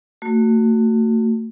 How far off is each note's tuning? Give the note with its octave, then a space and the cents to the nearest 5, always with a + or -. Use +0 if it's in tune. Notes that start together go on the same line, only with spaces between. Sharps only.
A3 +35 F#4 +0